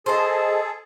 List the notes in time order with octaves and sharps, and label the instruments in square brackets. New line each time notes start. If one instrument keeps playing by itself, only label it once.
[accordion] G#4 A4 [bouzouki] C5 D#5